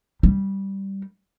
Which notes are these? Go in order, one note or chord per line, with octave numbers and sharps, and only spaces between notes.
G3